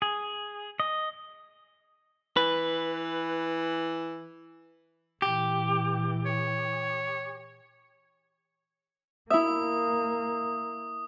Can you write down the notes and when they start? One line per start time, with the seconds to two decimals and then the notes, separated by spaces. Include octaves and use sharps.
0.02 G#4
0.80 D#5
2.37 E3 B4
5.22 A#2 E3 G4
6.26 C#5
9.30 A#3 E4 E5 D#6